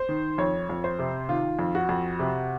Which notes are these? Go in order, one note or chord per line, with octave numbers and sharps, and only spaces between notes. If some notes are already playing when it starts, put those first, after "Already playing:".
Already playing: C5
D#3
F2 C#5
F2
C5
C3
D#3 F4
F2
F#4
F2
C3